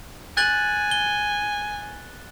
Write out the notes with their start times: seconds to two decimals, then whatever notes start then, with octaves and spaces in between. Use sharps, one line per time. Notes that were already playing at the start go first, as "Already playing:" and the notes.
0.37 G#5 F#6 A6 F#7
0.91 G7